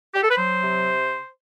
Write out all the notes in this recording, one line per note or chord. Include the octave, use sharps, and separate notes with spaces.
G4
A4
B4
F#3 C5
C3